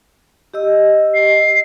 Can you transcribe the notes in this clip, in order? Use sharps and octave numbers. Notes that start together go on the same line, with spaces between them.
G4 D#5 E6
C7